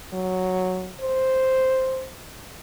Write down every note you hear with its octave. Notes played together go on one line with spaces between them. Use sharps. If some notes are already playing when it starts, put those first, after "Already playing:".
F#3
C5